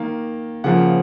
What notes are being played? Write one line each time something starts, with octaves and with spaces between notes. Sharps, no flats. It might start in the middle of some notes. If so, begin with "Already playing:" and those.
Already playing: D#3 A#3 F5
C#3 F3 A#3 F#5